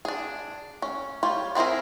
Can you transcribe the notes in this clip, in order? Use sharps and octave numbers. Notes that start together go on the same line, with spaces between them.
D4 G#4
C#4
G3 F4 C#5
B3 C4 E4 G#4 A#4